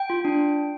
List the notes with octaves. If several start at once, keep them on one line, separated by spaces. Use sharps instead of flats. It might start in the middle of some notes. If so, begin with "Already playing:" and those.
Already playing: G5
F4
D4